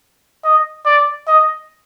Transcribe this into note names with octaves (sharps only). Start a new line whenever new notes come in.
D#5
D5
D#5